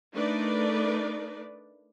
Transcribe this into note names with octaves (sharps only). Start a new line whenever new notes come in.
A3 D4 D#4 A#4 B4 D5